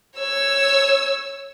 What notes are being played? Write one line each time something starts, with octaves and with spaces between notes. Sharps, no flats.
C#5 E6